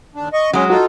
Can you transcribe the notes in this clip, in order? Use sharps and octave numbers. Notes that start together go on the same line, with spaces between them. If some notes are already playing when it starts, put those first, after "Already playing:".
D#2 D4
D#5 C#6
F#3 G#3 C#4
D#4 F4 F#4 A4